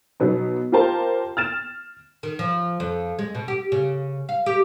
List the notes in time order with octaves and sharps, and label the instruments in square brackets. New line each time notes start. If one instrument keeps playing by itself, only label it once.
[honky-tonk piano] B2 F#3 B3 D#4
F4 G4 A#4 C5 A5 A#5
F6 A6 E7
[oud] D#3
F3
F2
G#3
B2
G4
C#3
F5
G4